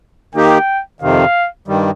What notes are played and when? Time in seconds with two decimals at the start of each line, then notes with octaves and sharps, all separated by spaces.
0.35 D#3 A#3 D#4 G4 G5
1.01 F2 C3 D#3 F5
1.68 G2 D#3 G3